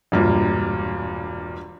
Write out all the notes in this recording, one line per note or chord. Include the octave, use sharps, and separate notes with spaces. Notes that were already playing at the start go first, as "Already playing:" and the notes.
E1 G2 A#2